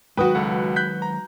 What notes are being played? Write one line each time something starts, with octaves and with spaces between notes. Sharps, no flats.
D#3 F#3 G#3 F#4 B4 G5 D#6
C#2 A4 F#5
F#6 G6 B6
A#5